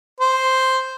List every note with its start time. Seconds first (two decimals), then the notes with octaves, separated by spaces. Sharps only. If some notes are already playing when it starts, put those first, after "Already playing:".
0.20 C5